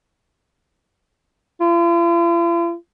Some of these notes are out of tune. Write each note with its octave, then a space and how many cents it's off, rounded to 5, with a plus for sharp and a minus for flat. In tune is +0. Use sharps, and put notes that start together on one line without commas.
F4 -45